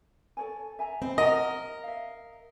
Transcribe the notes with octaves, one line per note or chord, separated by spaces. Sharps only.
A4 C#5 G#5
E5 G#5 A#5
C4 D#5 B5
A#4 D#5 F#5
E5 F5